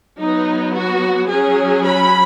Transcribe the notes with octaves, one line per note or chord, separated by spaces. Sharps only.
F#3 B3 D#4
F#4
F#3 C#4 G#4
B5